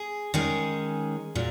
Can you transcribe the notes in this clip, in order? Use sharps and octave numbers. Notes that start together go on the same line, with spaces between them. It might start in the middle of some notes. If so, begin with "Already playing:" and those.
Already playing: G#4
D#3 G#3 C#4 G#4
A#2 F#3